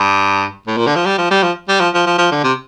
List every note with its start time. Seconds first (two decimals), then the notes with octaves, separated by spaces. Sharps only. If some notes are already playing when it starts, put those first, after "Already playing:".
Already playing: G2
0.67 A2
0.77 A#2
0.87 D3
0.96 F3
1.06 G3
1.18 F3
1.31 G3
1.43 F3
1.69 G3
1.80 F3
1.94 F3
2.06 F3
2.18 F3
2.31 D3
2.44 C3